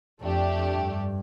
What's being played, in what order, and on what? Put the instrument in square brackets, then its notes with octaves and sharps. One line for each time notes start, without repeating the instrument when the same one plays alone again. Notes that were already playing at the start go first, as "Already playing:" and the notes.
[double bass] F2 [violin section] A3 D4 G4
[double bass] G2